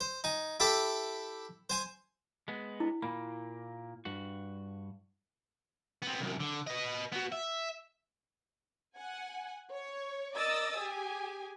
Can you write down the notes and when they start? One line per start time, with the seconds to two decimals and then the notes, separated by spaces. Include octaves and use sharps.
0.01 C5
0.24 D#4 G#5
0.60 E4 G4 A4 E5 B5
1.70 C5 G#5 C6
2.48 G#3 B3
2.80 E4
3.02 A#2 A#3 B5
4.05 G2 F#4
6.02 B3 C4
6.21 C2 F#2
6.40 D3
6.67 B4 D#5
7.12 B3 F#4
7.32 E5
8.96 F#5 G#5
9.71 C#5
10.35 A#4 D5 D#5 D#6 E6 A6
10.76 G4 G#4 G#5